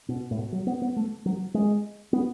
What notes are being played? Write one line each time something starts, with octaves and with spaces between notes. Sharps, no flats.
B2
A2
B2
F#3
B3
B3
A3
F#3
G#3
B3